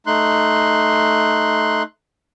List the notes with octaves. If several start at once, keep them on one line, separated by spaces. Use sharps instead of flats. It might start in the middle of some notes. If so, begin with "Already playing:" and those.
A3 D#4 C6 F#6